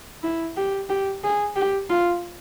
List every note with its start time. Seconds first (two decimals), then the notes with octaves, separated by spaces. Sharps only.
0.23 E4
0.57 G4
0.89 G4
1.24 G#4
1.56 G4
1.90 F4